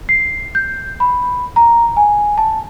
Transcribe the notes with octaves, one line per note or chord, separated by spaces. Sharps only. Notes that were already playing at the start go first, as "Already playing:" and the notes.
C7
G6
B5
A#5
G#5
A5